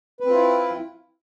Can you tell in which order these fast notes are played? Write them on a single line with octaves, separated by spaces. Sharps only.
B4 C4 F4 E4